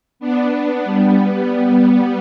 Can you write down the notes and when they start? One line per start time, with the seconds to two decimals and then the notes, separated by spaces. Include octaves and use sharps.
0.20 B3 D4
0.84 G3 B3